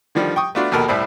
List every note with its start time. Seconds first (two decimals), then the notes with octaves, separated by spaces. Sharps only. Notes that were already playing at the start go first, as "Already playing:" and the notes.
0.15 D3 D#3 F3 G3
0.36 G5 C#6 D#6
0.55 A3 B3 D4 F4 F#4
0.71 A#1 D#2 B2 A4 A#4 B5
0.88 C2 A2 G3 E4 C5 B5